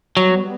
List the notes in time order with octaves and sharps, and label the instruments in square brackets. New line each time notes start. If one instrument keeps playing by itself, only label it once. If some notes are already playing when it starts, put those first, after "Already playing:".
[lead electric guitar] F#3 [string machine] G3 B3